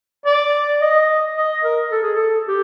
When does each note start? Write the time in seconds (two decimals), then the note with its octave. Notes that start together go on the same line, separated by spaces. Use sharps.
0.26 D5
0.81 D#5
1.37 D#5
1.64 A#4
1.92 A4
2.03 G#4
2.15 A4
2.48 G4